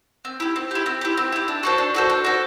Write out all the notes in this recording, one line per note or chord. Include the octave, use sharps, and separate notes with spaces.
C4
E4 G4
C4
E4 G4
C4
E4 G4
C4
E4 G4
D4
F#4 A4 C5
D4
F#4 A4 C5
D4
F#4 A4 C5